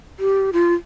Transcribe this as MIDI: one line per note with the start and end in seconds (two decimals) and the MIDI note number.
0.20 0.50 67
0.53 0.74 65